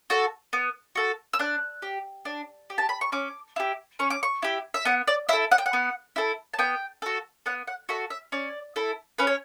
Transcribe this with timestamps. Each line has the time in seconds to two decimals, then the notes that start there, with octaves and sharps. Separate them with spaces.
0.10 F#4 A4
0.53 B3
0.95 F#4 A4
1.33 E6
1.39 D4 F#6
1.82 G4
2.25 D4
2.70 G4
2.78 A5
2.89 B5
3.01 C#6
3.12 C#4 D6
3.56 E4 G4
3.99 C#4 C#6
4.10 D6
4.23 C#6
4.42 E4 G4
4.74 E5
4.85 B3 F#5
5.07 D5
5.29 E4 E5
5.33 A4
5.51 F#5
5.58 G5
5.66 F#5
5.73 B3
6.16 E4 A4
6.54 A5
6.59 B3 G5
7.02 F#4 A4
7.46 B3 F#5
7.67 F#5
7.89 F#4 A4 E5
8.10 E5
8.32 C#4 D5
8.76 E4 A4
9.18 C#4 B4
9.27 C#5